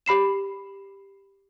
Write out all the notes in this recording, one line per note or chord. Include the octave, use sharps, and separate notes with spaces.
G4 B5 C7 E7